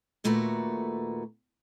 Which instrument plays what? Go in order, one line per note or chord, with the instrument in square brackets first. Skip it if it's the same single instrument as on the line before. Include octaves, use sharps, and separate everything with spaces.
[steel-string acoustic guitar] D#2 A#2 A3 F#4 B4 A#5